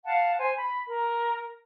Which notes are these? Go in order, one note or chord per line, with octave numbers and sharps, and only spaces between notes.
F5 F#5 A5
C5 G#5
B5
A#4